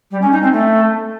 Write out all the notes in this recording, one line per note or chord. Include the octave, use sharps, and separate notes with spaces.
G3
C#4
D#4
C4
A3